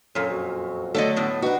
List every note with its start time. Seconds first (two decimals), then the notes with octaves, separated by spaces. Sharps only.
0.15 F#2 A#2 C#4 A4
0.30 F2 F#4
0.95 D3 F#3 A3 A4 D5 D#5
1.16 A2 B3
1.42 D4 D#4 F#4 B4